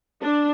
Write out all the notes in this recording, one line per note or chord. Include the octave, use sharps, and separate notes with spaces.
D4